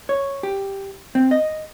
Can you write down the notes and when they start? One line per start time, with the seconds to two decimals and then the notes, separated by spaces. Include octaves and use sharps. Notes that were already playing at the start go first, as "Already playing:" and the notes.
0.09 C#5
0.43 G4
1.15 C4
1.31 D#5